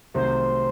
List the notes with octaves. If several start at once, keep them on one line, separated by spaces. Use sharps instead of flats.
C2 C3 D#3 F#3 A3 C5